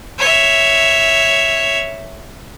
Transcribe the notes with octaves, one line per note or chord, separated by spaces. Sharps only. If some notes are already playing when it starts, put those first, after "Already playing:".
C#5 E5